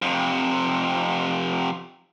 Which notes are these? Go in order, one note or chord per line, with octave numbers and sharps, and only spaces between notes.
F2 C3